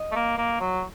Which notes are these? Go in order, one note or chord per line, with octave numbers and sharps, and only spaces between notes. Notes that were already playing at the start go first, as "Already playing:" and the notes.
Already playing: D#5
A3
A#3
A#3
F#3